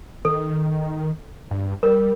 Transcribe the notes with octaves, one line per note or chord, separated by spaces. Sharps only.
D#3 A4
G2
G3 A#4